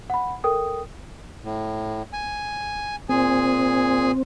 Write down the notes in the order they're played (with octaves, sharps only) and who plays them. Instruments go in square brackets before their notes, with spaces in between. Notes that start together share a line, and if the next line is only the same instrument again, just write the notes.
[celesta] F#5 B5
A4 A#4 G5 D#6
[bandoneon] A2
G#5
[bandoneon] A#2 G#4 G#5 [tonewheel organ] C4